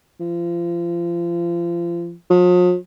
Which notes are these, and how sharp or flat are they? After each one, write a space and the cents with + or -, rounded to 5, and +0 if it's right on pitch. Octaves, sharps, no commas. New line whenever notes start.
F3 -30
F3 +45